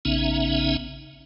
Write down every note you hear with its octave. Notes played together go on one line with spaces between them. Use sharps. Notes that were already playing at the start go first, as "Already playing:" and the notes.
A#1 C#3 B3 C#4 D#4 E5